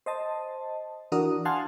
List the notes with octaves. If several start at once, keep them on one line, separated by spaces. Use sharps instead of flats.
C5 D#5 A5
E3 D4 F#4 A#4 D#6
F5 F#5 G#5 A5 C6 F6